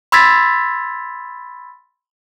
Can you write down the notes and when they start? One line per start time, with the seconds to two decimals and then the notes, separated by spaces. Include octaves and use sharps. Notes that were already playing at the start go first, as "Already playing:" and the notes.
0.12 B5 C6 E6 G#6 A6 B6